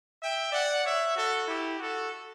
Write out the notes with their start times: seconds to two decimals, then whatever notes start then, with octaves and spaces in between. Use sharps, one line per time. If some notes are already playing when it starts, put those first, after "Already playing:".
0.21 E5 G5
0.53 D5 F#5
0.84 C#5 E5
1.16 F#4 A4
1.47 E4 G4
1.79 F#4 A4